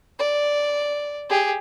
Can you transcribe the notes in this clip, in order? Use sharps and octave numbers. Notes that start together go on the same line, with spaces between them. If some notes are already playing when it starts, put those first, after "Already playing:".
D5
G4 G#4